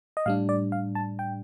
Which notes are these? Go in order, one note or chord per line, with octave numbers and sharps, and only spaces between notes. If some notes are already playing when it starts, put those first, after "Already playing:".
D#5
A2 G3 D4 F5
D5
F5
A5
G5